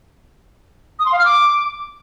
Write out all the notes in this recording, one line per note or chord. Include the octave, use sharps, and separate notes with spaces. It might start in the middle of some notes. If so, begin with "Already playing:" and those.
D#6
C6
F5
F6
D6